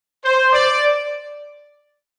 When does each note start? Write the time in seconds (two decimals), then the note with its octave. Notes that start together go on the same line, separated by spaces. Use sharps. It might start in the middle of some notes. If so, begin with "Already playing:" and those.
0.24 C5
0.53 D5